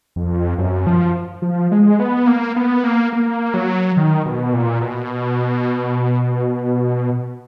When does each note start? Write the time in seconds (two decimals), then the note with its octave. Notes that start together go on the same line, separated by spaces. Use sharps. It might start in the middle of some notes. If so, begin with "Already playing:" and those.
0.16 F2
0.58 F#2
0.87 F3
1.42 F3
1.71 G#3
2.00 B3
2.27 A#3
2.56 B3
2.84 A#3
3.13 A#3
3.54 F#3
3.97 D#3
4.26 B2
4.53 A#2
4.81 B2